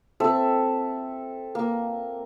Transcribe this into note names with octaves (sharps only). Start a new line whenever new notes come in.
C4 A4 E5
A#3